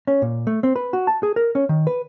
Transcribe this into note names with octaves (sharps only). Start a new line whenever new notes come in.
C#4
A#2
A3
C4
B4
F#4
A5
G#4
A#4
C#4
D#3
B4